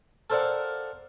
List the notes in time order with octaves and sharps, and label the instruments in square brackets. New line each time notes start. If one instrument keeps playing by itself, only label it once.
[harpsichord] A4 A#4 C5 D5 F5 F#5